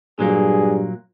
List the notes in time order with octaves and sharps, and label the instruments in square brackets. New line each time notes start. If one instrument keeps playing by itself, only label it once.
[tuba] G2 [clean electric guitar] A#2 F#3 A#3 [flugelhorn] G#4